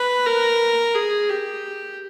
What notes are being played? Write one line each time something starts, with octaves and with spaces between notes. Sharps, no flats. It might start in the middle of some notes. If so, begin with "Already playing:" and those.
Already playing: B4
A#4
G#4
G4